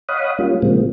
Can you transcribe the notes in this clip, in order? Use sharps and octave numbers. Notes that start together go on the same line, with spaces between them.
C#5 D#5 F5 F#5 B5 D#6
G3 A#3 C#4 F4
A#2 C#3 F3 G#3 A#3 C4